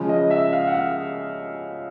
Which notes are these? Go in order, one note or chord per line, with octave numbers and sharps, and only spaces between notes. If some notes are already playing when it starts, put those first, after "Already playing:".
Already playing: C#3 F3 G#3
D#5
E5
F5
F#5
F5